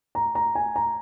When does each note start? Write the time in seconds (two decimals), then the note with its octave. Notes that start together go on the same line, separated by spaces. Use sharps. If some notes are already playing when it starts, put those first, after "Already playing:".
0.15 A#5
0.35 A#5
0.55 G#5
0.76 A#5